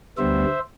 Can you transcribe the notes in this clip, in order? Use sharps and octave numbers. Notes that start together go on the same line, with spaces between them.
D2 D3 G3 B3 C5 E5